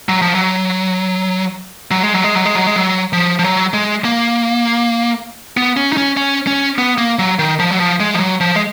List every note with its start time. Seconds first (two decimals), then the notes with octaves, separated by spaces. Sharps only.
0.09 F#3
0.22 F3
0.35 F#3
1.91 F#3
2.03 G#3
2.13 F#3
2.24 G#3
2.35 F#3
2.45 G#3
2.55 F#3
2.67 G#3
2.76 F#3
3.13 F3
3.39 F3
3.44 F#3
3.73 G#3
4.05 A#3
5.57 B3
5.77 C#4
5.93 D#4
5.97 C#4
6.17 C#4
6.47 C#4
6.78 B3
6.98 A#3
7.19 F#3
7.39 D#3
7.59 F3
7.71 F#3
7.80 F3
8.00 G#3
8.14 F3
8.20 F#3
8.40 F3
8.56 G#3